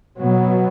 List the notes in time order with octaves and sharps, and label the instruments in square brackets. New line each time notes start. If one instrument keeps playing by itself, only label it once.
[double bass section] B2 F#3 B3